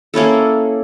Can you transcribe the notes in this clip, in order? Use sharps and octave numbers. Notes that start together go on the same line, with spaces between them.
A#3 C#4 E4 A4